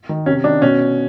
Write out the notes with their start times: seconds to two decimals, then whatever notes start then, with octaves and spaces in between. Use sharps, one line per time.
0.09 D#3
0.26 C3 C#4
0.44 D#3 D4
0.62 B2 C#4